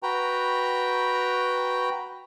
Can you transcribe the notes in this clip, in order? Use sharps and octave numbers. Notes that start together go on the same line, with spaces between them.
F#4 B4 G5 A#5